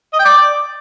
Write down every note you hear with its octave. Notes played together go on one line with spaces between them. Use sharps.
D#5
G5
D5